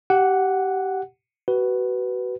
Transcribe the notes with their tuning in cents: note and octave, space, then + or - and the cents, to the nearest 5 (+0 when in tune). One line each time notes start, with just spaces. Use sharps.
G4 -20 F#5 +0
F#4 +30 B4 +0